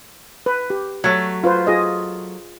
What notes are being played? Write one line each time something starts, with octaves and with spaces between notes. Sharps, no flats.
B4
G4
F#3 A3
F4 B4 C5
F4 G#4 D#5